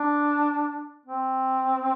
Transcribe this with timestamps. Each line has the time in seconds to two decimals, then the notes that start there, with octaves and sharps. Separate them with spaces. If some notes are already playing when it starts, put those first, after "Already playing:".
Already playing: D4
1.06 C4